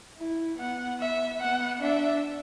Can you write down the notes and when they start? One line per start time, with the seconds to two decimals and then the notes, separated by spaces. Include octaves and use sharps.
0.18 E4
0.58 B3 F#5
1.00 E5
1.41 B3 F#5
1.81 D4 E5